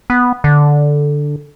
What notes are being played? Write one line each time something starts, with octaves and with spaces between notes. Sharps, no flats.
B3
D3